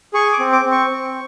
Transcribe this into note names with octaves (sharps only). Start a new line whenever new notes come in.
G#4 C#6
D6
C4
D6
C4
C#6
C4